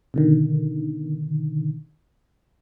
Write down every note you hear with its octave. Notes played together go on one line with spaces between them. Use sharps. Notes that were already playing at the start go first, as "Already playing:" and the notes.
B2 D3 D#3